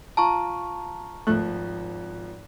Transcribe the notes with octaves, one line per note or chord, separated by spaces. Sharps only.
F4 A5 A#5 C#6
G#1 F3 A3 F#6